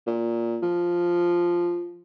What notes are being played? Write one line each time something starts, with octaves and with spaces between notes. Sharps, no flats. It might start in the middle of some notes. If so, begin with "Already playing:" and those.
A#2
F3